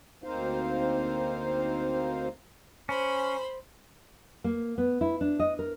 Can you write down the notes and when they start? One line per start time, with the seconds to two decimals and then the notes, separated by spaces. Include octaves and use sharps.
0.24 D2 A#3 C4 D#4 C5 F5
2.89 C#4 C5 B5
4.44 A#3
4.78 B3
5.01 E4
5.21 D4
5.39 D#5
5.59 A#4